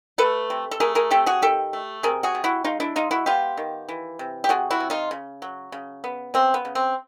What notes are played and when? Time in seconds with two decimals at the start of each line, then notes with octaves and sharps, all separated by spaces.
0.18 A3 A4 B4
0.50 C3
0.71 A4
0.80 A3 G#4 A#4
0.95 G#4 A#4
1.11 C3 G4 A4
1.26 F#4 G#4
1.42 D#3 G4 A4
1.73 A3
2.03 C3 G#4 A#4
2.23 F#4 G#4
2.35 C3
2.44 E4 F#4
2.64 G#3 D#4 F4
2.80 D4 E4
2.96 G#3 D#4 F4
3.11 E4 F#4
3.26 B3 F4 G4
3.57 D#3
3.89 E3
4.19 C3
4.44 G4
4.49 C3 F#4 G#4
4.70 E4 F#4
4.80 C3
4.90 D#4 F4
5.11 C#3
5.42 F#3
5.72 C#3
6.04 B3
6.34 C#3 C4
6.54 B3
6.65 C#3
6.75 C4